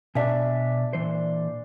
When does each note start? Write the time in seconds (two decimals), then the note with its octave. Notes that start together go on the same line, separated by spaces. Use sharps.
0.15 B2 D4 E5 G#5
0.93 A#2 E3 C5